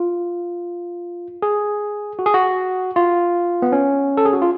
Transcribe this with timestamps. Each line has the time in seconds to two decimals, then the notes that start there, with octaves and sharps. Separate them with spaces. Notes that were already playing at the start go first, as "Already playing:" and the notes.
Already playing: F4
1.42 G#4
2.19 F#4
2.26 G#4
2.34 F#4
2.96 F4
3.62 B3
3.72 C#4
4.17 A4
4.25 G#4
4.33 F#4
4.42 F4